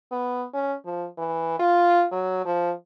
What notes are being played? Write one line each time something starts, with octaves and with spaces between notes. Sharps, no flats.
B3
C#4
F3
E3
F4
F#3
F3